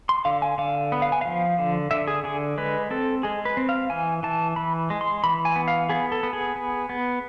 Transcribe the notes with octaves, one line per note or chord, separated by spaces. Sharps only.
C6
D3 F5
G#5
D3 F5
B3
F5
G#5
F3 F5
D3
D3 E5
G#4
D3 G#4
G#3 B4
C4 A4
G#3 G#4
B4
C4
F5
E3 G#5
E3 A5
E3 B5
G#3
C6
E3 B5
G#5
B3
F5
B3 G#4
A4
B3
G#4
B3
B3